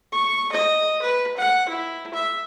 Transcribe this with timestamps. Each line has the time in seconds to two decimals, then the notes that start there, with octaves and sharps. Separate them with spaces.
0.12 C#6
0.52 D#5
1.02 B4
1.37 F#5
1.69 E4
2.14 E5